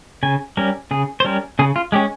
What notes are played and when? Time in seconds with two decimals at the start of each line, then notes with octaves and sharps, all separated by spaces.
0.23 C#3 G#5
0.57 G3 C#4 A#4
0.91 C#3 G#4
1.20 C5
1.25 G3 C#4 A#4
1.59 C#3 G#4
1.76 F4
1.92 G#3 C#4 G4